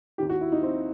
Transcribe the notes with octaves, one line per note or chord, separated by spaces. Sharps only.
D#2 D#3 G4
F#4
E4
D#4
C4